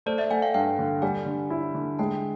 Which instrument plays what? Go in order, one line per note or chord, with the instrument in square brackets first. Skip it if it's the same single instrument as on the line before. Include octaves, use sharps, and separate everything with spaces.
[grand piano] A3 [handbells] C5 D5
[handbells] D5 E5
[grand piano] A3 [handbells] F#5 G#5
[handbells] F5 G5
[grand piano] G2 [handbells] F5 G5
[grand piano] D3
[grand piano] G3 [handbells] F#5 G#5
[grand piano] D3
E4
D3
[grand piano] G#3 [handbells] G5 A5